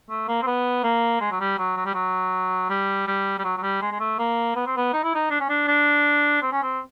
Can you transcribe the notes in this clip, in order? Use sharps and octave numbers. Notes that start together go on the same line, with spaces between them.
A3
A#3
C4
B3
A#3
G#3
F#3
G3
F#3
F#3
G3
F#3
G3
G3
G3
F#3
F#3
G3
G#3
G#3
A3
A#3
B3
C4
B3
D#4
E4
D#4
D4
C#4
D4
D4
C4
C#4
C4